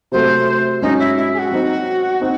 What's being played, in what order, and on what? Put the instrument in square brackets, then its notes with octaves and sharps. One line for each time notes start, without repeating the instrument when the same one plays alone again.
[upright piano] C3 F#3 A3 [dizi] C5
[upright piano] G#2 F#3 C#4 [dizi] D#4
[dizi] E4
E4
G#4
F#4
[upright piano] F#3 C4 D#4
C4 D#4